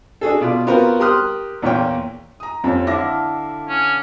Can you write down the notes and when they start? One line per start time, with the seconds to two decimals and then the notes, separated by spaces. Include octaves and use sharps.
0.21 D4 F#4 G#4 A4
0.41 B2 F4 D5
0.67 B3 C4 F4 F#4 A#4
1.00 G4 A#4 C6 D#6 F6 F#6
1.62 E2 A#2 F4 C#5 G5
2.40 A#5 D#6
2.64 F2 C4 C#4
2.87 D3 E4 F5 D6 E6 A#6
3.68 C#4